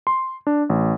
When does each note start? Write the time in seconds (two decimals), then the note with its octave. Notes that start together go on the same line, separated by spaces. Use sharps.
0.07 C6
0.47 D4
0.69 A1